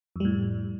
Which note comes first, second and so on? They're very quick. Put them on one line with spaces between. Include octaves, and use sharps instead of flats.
F2 G3 A2